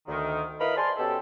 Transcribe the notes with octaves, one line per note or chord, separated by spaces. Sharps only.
D2 D#3
E4 A#4 B4 D#5 F5 B5
C5 D5 G#5 A5 C6
B2 C#4 G4 A4